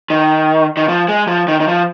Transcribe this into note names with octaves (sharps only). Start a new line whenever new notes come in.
D#3
D#3
F3
G#3
F3
D#3
D#3
F3